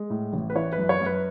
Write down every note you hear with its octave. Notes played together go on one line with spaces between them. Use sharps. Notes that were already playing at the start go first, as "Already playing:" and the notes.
Already playing: G#3
A2
A1
B4
E3 C#5
B4
F#2
C#5
F#2 B4